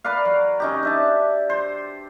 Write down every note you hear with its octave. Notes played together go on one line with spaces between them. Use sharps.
A#4 B4 D5 F5
F#3
C#4 D#4 G4
D4 E5 A5
C5